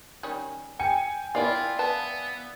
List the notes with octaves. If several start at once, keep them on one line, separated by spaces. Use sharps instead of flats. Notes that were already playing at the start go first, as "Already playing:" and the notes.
D#3 G3 C#4
G5 G#5 C#7
A#3 E4 F4 D5 F5
B3 B4 A5